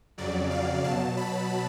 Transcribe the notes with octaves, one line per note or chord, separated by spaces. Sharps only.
F2 C#3 F#3 D5
F5
B2 F#3 A5
B5